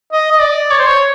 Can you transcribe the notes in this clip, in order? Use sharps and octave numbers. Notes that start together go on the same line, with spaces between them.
D#5
D#5
D5
C#5
C5
C#5